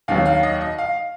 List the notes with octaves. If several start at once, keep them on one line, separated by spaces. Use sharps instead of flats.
D#2 D#3 F#3 F5
F5
D#5
D#5
F5